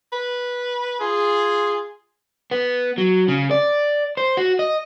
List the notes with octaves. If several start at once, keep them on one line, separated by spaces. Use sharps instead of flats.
B4
F4 G#4
B3
F#3
C#3
D5
C5
F#4
D#5